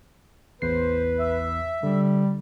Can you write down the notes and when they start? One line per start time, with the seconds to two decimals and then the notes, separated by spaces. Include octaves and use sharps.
0.62 A1 E2 B4 C5 C7
1.19 E5
1.83 D3 G3